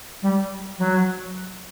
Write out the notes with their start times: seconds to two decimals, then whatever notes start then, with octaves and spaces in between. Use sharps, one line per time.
0.22 G3
0.78 F#3